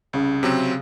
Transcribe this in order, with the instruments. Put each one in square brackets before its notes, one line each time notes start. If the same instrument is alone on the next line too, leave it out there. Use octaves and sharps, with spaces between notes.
[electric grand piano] C2 [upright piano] C#3
[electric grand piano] C3 F#3 C4